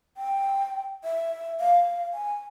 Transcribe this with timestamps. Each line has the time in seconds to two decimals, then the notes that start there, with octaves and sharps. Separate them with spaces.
0.17 G5
1.04 E5
1.60 F5
2.14 G#5